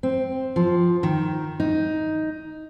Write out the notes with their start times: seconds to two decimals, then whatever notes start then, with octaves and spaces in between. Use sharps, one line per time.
0.03 C4
0.56 F3
1.03 D#3
1.60 D#4